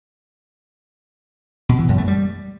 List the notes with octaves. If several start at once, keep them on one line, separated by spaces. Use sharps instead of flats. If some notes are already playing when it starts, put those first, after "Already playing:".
B2
E3
F#2
A3
G3